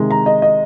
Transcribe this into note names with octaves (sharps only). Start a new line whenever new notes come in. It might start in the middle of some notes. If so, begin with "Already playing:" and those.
Already playing: C3 D#3 G#3
A#5
D#5
D#5